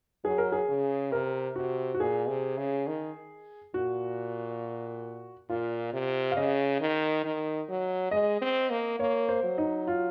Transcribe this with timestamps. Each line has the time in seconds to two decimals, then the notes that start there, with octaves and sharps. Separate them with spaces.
0.24 F#3 G#4
0.38 A#4
0.52 G#4
0.69 C#3
1.11 C3 A#4
1.56 C3 F#4
1.94 F#4
2.00 A#2 G#4
2.28 C3
2.58 C#3
2.87 D#3
3.74 A#2 F#4
5.49 A#2 F4
5.93 C3
6.32 F5
6.37 C#3 D#5
6.81 D#3
7.24 D#3
7.69 F#3
8.11 G#3 D#5
8.41 C4
8.70 A#3
8.99 A#3 C#5
9.29 C5
9.44 F#3
9.58 D#4
9.87 F4